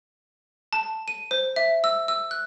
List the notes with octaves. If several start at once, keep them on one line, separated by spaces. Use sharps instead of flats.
A5
D#7
C5
E5
E6
E6
F#6